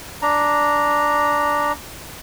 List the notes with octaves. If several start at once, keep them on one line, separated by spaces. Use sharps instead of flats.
D4 A#5